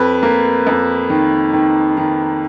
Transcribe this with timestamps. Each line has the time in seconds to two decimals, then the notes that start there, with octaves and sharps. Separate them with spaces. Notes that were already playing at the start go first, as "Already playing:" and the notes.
Already playing: F2 B4
0.23 A#3
0.67 F2
1.10 D#3
1.53 D#3
1.97 D#3